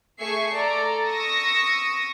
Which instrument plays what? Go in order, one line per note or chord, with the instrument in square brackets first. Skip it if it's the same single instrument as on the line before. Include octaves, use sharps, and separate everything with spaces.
[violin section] A3 G#4 E5 G#5 C#6 C7
A4 D5 A#5
C#6 D#6 E6 A#6 C#7